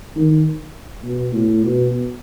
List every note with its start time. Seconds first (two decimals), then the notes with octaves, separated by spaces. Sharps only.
0.15 D#3
1.04 B2
1.34 A2
1.63 B2